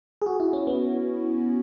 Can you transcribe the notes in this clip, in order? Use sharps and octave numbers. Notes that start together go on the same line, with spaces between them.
G#4
F#4
E4
C#4
B3